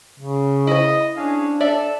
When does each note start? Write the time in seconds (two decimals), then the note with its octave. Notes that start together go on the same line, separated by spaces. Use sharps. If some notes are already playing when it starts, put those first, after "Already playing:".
0.20 C#3
0.67 E4 C5 D#5
1.17 C#4 D4 G#4 F5
1.61 A4 D5 E5